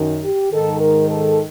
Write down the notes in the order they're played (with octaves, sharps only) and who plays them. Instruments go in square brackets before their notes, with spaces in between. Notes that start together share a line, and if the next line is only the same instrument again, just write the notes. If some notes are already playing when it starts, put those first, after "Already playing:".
Already playing: [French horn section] F#2 D#3
G4
G#2 D#3 A4
A#4
A4